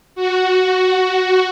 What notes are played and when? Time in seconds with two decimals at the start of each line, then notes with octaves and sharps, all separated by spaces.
0.15 F#4